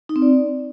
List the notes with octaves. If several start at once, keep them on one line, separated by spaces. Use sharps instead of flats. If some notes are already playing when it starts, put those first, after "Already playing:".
D#4
C4
D5